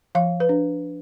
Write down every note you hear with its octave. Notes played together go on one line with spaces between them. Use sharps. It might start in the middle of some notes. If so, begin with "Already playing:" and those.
F3 F5
B4
D4